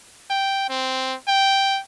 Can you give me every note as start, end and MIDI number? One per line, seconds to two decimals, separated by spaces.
0.30 0.64 79
0.69 1.15 60
1.28 1.81 79